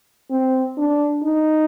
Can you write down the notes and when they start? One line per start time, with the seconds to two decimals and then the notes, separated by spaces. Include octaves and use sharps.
0.31 C4
0.78 D4
1.23 D#4